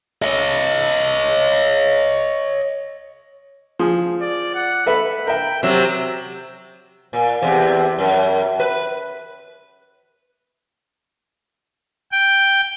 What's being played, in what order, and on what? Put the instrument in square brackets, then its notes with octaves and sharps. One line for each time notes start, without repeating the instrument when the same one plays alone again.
[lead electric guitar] C#5 D#5
[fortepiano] F3 G#4
[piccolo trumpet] D5
F#5
[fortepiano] A4 B4 E5 [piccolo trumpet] B5
[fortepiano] A#4 E5 [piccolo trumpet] G5
[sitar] C3 F#3 [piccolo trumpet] E6
[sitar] A#2
E2 C3
F#2
B4
[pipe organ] G5